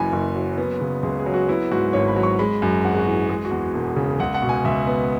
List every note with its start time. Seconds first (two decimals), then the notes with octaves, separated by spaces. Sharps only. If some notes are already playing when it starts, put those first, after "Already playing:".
Already playing: F#1 F#2 E3 G#5 B5
0.13 F#1
0.36 F#3
0.58 B3
0.81 C#3
1.03 C#2 G#4
1.19 G#4
1.26 F#3
1.34 F#4
1.48 B3 E4
1.71 G#2 F#4
1.93 G#1 C#5
2.08 B5
2.16 F#3
2.23 C#6
2.39 G#3 B5
2.62 F#2
2.84 G#1 F#5
2.94 G#4
2.99 F#4
3.07 E3
3.14 F#4
3.29 G#3 G#4
3.45 F#4
3.51 E2
3.60 F#4
3.74 E1
3.96 C#3
4.19 C#2 F#5
4.34 F#5
4.42 B2
4.49 G#5
4.64 C#2 E5
4.87 B3